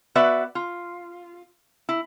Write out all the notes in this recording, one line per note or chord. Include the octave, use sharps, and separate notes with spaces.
B3 F#4 B4 D5 E5
F4
E4